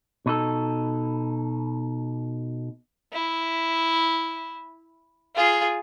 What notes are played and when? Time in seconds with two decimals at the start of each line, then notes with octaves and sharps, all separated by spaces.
0.26 B2 D#4 A4
3.13 E4
5.36 F4 G#4